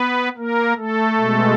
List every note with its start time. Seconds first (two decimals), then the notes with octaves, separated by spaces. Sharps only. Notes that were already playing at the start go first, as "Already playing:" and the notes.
Already playing: B3 B4
0.37 A#3 A#4
0.77 A3 A4
1.18 B2 G#3